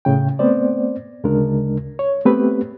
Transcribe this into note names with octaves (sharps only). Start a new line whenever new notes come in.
A2 C#3 G5
A3 B3 C4 C5 D5
D2 C#3 G#3 D4 A#4
C#5
A3 B3 C4 G4 B4